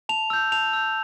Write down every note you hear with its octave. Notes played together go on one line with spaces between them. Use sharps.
A5 F7
E6 G6
A5 F7
E6 G6